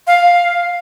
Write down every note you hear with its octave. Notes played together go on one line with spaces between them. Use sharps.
F5